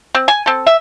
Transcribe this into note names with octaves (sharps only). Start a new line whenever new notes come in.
C4
G#5
C4 A4
E5